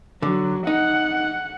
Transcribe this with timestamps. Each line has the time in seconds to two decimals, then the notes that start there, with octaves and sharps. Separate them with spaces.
0.22 D3 F#3
0.67 D#4 F#5